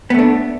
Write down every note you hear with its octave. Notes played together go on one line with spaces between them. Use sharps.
A3 B3 D4